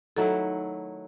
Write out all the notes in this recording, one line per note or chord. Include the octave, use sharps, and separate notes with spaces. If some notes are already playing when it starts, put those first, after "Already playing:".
D#3 F#3 A3 E4 A4